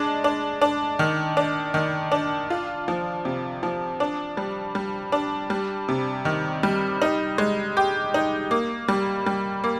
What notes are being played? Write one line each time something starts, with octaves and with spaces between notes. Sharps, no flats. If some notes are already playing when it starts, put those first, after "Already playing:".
Already playing: G#3 D4
D4
D4
D#3
D4
D#3
D4
F4
F3
C3
F3
D4
G3
G3
D4
G3
C3
D#3
G3
D#4
G#3
G4
D#4
A#3
G3
G3
A#3